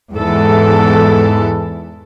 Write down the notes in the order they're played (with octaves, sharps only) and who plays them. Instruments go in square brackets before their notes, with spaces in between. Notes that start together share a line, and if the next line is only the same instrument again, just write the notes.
[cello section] E2 G#2 E3 A4